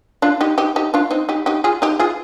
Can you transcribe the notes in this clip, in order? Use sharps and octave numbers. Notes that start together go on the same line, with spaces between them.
D4 F4
D#4 G4
D#4 G4
D#4 G4
D4 F4
C4 D#4
D#4 G4
D#4 G4
F4 G#4
D#4 G4
F4 G#4